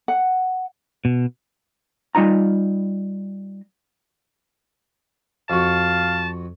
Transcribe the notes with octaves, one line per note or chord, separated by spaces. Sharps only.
F#5
B2
G3 D#4 F4 A#5
F2 F#4 F5 A5